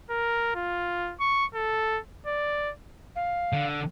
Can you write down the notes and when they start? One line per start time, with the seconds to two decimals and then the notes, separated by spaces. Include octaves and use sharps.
0.10 A#4
0.55 F4
1.20 C#6
1.55 A4
2.26 D5
3.16 F5
3.53 D3